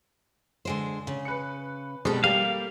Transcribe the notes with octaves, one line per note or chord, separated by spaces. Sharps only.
D3 G#3 C5
C#3
B4 C#7
B2 G3 G#3 C4 A4
G3 A#3 G4 F5